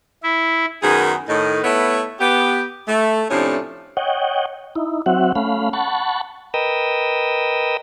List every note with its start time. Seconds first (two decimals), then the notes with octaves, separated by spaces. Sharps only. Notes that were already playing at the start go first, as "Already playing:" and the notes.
0.23 E4
0.82 F#2 D#3 B3 G#4
1.29 A2 D#3 D#4
1.64 A3 B3 E4 B4 C#5 E5
2.20 B3 G4
2.88 A3
3.30 A2 C3 F3 A3 C#4 D4
3.97 C#5 D#5 F#5 G5
4.76 D#4 E4
5.06 F#3 C4 F#4 E5 F#5
5.35 A3 C#4 F5 B5
5.73 F#5 A5 B5 C#6
6.54 A#4 B4 D#5 G5 D#6 E6